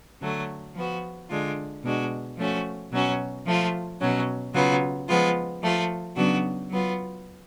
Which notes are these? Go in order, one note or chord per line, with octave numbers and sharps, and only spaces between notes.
D3 F#3 A3
F3 B3 F#4
D3 G#3 D4 F4
B2 G#3 D4 F#4
F3 A3 C#4 F#4
B2 F#3 C#4 F#4
F3 A3 F4
B2 F#3 C#4
C#3 F#3 B3 F4
F3 G#3 B3 F4
F3 A3 F4
C#3 F#3 B3 D4 F#4
F#3 B3 F4